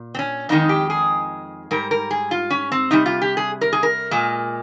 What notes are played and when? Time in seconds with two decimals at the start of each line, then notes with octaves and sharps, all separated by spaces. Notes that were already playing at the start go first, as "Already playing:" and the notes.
Already playing: A#2
0.15 C4
0.19 C#4
0.49 F2 D#3 G#3 D#4
0.69 G4
0.90 G#4
1.71 G#2 G3 A#4
1.91 A#4
2.11 G#4
2.31 F4
2.50 C#4
2.72 C4
2.91 C3 G3 D#4
3.06 F4
3.22 G4
3.37 G#4
3.61 A#4
3.73 G#4
3.83 A#4
4.11 A#2 G#3